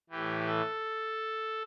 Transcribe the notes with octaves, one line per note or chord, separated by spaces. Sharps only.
A2 E3 G4
A4